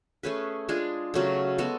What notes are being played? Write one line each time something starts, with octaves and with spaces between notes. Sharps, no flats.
A3 C#4 G#4 B4
G#3 D4 F4 G#4
C#3 F#3 A3
G#3 B3 F#4 A4